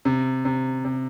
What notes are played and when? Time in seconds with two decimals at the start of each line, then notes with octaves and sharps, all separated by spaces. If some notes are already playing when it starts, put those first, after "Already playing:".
0.05 C3
0.45 C3
0.85 C3